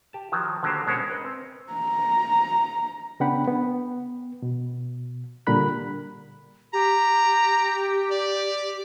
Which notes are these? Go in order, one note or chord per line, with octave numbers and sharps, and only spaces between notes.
G4 A5
D#3 F3 F#3
D3 D#3 F#3 A#3 G4 C5
B2 G#3 C#4 A#4 C5 C#5
A#4 B4 D#5
C4
A#5
C#3 B3 D4 F#5 G5 B5
B3
B2
A#2 D3 G3 A#4 B5 F#6
G4 A#5
D5